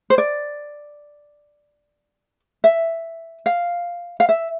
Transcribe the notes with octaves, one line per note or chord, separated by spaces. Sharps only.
C5
D5
E5
F5
F5
E5